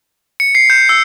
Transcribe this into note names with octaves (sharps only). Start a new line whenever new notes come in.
C#7
C7
G6
E6